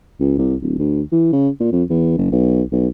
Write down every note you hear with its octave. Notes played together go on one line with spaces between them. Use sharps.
C#2
C2
D1
D2
E3
C#3
A#2
F2
E2
F#1
B1
B1